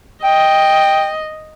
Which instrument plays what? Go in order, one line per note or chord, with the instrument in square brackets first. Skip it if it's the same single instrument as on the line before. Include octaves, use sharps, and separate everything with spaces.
[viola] D#5 [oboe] G5